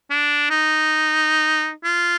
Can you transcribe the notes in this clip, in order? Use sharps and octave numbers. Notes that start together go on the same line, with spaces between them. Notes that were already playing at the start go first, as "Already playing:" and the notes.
D4
D#4
F4